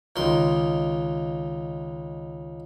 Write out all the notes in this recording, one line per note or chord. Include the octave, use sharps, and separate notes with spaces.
C#2 D#3 C6